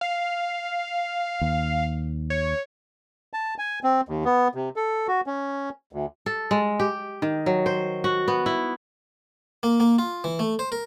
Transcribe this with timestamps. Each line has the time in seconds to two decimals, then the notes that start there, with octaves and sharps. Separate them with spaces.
0.01 F5
1.41 D#2
2.30 C#5
3.33 A5
3.58 G#5
3.84 C4
4.09 D#2
4.25 B3
4.55 C3
4.76 A4
5.08 F#4
5.27 C#4
5.93 D2
6.26 A4
6.51 G#3
6.80 G4
7.22 D#3
7.46 F#3
7.66 C5
8.04 F#4
8.28 B3
8.46 E4
9.63 A#3
9.80 A#3
9.99 F4
10.24 E3
10.39 A3
10.59 C5
10.72 A#4